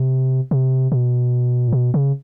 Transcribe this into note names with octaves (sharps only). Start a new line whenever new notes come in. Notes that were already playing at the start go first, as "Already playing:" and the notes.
Already playing: C3
C3
B2
A#2
B2
C#3